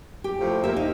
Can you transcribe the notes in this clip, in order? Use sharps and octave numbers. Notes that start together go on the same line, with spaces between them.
G4
A2 C3 F3
F3 A#3 G4 E5
D#4